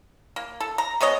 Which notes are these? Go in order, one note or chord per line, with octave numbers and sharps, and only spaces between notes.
A#3
A4
A#5
G#3 B3 C#5 D#5